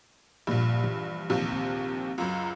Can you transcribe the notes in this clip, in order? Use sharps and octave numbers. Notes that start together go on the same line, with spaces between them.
A#1 G2 A#2 A#3
E3
A#1 D#2 C3
C4
C#2 F#2